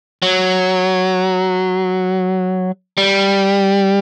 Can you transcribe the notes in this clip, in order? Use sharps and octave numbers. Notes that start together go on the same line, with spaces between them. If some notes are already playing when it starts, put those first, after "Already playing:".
F#3
G3